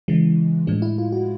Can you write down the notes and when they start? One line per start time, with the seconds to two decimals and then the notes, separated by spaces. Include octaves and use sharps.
0.08 C#3 E3 G#3
0.67 A2 F3 G#3 D4
0.82 E4
0.98 F4
1.12 F#4